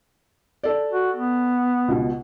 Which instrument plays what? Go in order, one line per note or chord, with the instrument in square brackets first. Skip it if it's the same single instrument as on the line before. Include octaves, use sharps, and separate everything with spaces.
[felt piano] A4 D5
[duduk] F#4
B3
[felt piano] C#2 B2